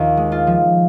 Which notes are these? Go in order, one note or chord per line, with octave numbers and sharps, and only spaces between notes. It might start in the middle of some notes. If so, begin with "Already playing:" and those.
Already playing: D#2 D#3 F4
G#3
F4
F3